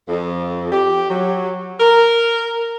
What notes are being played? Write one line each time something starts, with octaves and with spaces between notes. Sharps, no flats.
F2
G4
F#3
A#4